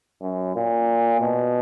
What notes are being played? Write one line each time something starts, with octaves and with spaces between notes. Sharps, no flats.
F#2
A#2
B2